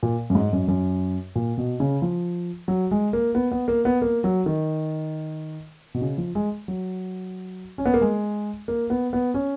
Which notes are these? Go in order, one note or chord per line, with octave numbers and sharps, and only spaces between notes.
A#2
F#2
G#2
F#2
F#2
A#2
B2
C#3
F3
F#3
G#3
A#3
B3
B3
A#3
B3
A#3
F#3
D#3
B2
C#3
F3
G#3
F#3
C#4
B3
A#3
G#3
A#3
B3
B3
C#4